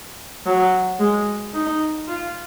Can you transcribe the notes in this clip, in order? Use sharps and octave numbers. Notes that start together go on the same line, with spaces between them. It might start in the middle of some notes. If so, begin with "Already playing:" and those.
F#3
G#3
D#4
F4